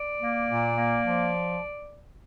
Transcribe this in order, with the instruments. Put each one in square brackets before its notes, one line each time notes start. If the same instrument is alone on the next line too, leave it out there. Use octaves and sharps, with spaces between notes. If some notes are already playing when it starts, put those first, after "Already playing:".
Already playing: [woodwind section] D5
A#3
A#2
A#3
F3